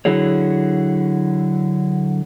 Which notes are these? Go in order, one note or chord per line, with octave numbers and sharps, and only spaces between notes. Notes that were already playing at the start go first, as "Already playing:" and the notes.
D3 F#3 E4 F#4 G#4 C#5